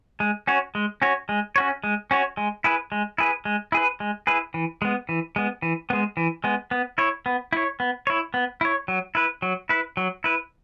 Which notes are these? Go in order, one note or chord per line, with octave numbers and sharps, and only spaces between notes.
G#3
C#4 F#4 C#5
G#3
C#4 F#4 C#5
G#3
C#4 F#4 C#5
G#3
C#4 F#4 C#5
G#3
E4 G#4 B4
G#3
E4 G#4 B4
G#3
E4 G#4 B4
G#3
E4 G#4 B4
E3
G#3 B3
E3
G#3 B3
E3
G#3 B3
E3
G#3 B3
B3
E4 C#5
B3
E4 C#5
B3
E4 C#5
B3
E4 C#5
F#3
E4 B4
F#3
E4 B4
F#3
E4 B4